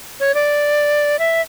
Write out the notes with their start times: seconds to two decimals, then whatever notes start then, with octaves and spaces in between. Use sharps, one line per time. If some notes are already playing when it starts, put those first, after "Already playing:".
0.20 C#5
0.34 D5
1.19 E5